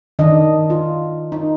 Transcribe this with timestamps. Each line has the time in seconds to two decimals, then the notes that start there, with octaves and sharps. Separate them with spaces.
0.19 D#3 D4 D#5
0.70 F4
1.32 D#4